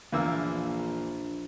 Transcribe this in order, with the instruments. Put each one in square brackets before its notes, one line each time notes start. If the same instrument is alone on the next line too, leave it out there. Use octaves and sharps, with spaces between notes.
[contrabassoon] A#1 [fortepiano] E2 A#3 E6